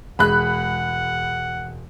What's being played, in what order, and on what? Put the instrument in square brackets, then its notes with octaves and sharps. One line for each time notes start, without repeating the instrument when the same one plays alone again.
[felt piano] E1 G#3 G#4 [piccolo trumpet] F#5 [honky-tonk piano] B5 F#6